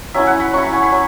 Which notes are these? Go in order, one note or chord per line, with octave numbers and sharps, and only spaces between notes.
F#3 C#4 E4 E5
F#5
B5
F#3 C#4 E4 C#6
B5
G#5
B5
F#3